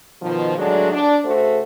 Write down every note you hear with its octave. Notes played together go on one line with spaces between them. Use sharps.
B2 D#3 F3
A2 D3 F#3 G#3 D4 F#4
D4
C#3 A3 F#4 C5